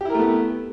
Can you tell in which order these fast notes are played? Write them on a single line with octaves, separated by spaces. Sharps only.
G4 E4 A#4 A3 B3